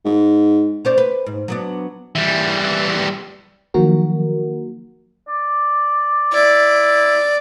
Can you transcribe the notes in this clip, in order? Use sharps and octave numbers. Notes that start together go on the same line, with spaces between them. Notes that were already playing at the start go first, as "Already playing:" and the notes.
G#2
C#4 C5 D5
B4
G#2
F#3 B3 D4
E3 G3
D#3 F3 F#3 A#3 F#4 A#4
D5
E4 D5